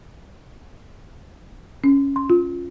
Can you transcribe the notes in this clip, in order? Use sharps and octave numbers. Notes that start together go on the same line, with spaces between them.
C#4
C6
F4